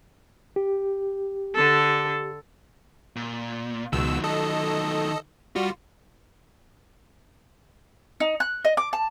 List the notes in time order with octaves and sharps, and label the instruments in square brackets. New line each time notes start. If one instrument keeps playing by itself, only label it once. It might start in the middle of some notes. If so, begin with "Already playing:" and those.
[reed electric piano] G4
[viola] D3 A4
[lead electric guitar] A#2
[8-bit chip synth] C#2 B2 E6 [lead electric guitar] D#3 F#3
[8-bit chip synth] A4 D#5
[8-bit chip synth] G3 F#4 [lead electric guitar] F4
[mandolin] D#4
F#6
D#5
D6
A5